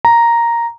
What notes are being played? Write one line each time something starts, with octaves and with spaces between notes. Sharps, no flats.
A#5